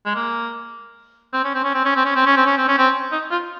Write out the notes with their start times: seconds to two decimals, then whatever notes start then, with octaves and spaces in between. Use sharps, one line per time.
0.05 G#3
0.15 A#3
1.33 C4
1.44 C#4
1.54 C4
1.64 C#4
1.74 C4
1.85 C#4
1.96 C4
2.05 C#4
2.16 C4
2.26 C#4
2.37 C4
2.46 C#4
2.57 C4
2.68 C#4
2.78 C4
3.12 D#4
3.31 F4